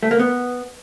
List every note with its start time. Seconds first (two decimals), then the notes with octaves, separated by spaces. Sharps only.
0.03 A3
0.11 A#3
0.19 B3